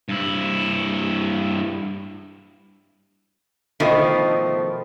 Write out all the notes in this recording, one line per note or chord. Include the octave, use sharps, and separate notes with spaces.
G2 E4
B2 D#3 F3 A3